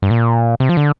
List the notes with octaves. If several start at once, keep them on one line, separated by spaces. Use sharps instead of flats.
G2
A#2
C3
F3
D3